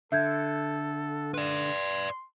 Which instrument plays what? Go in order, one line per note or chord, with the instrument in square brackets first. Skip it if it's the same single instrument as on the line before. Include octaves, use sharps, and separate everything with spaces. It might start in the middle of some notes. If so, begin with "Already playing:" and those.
[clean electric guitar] D3 [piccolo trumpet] A4 [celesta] E5 G6 G#6
[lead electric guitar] B4 D5 [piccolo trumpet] C6